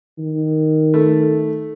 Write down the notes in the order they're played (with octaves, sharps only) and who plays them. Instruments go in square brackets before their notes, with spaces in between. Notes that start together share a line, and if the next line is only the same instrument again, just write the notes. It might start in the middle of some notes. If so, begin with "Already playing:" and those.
[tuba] D#3
[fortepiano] A3